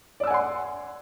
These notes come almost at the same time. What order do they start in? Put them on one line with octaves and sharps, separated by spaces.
D5 E6 G#5 F#5 C6